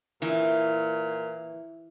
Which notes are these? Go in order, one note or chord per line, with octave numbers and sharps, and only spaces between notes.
A#2 E3